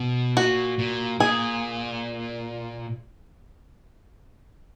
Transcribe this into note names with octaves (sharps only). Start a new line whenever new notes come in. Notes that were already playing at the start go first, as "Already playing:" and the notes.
Already playing: B2
A#2 F#4
A#2
A#2 G#4